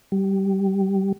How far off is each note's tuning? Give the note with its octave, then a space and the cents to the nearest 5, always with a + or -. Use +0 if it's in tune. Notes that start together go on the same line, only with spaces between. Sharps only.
G3 -15